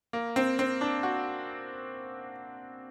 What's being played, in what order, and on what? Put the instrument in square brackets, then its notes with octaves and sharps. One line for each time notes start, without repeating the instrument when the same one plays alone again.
[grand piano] A#3
C4
C4
D4
F#4